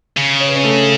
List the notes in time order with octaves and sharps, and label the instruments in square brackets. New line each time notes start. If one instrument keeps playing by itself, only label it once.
[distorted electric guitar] C#3
[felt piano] C#5
B4
C#4 C#5
A3 A4